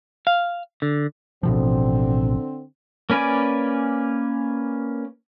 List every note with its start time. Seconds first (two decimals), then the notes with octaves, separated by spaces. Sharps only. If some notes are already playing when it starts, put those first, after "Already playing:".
0.27 F5
0.82 D3
1.43 A1 B2 D3 F3 C4
3.10 A#3 C#4 B4 D5 G#5